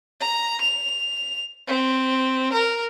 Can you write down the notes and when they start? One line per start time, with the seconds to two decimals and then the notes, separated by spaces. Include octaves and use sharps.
0.21 A#5
0.61 F7
1.67 C4
2.52 A#4